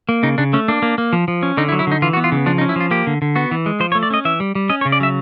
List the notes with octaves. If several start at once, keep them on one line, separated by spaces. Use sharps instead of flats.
A#3
C#3 D#4
C#3 D4
A3 C#4
A#3 D4
A#3
A#3
F3
F3
C#4
D3 D#4
E4
F#3
E4
D3 D#4
E3 F4
F#4
B3
F4
C#3
F3 D4
D#4
C#4
E4
F3 F4
A#3 G4
D3
D3
B3 F#4
E3
G#3
F3 C5
C#5
A3
D5
C#4 D#5
E3 E5
G3
G3
C#4 D#5
C#5
C#3
D5
F#3 E5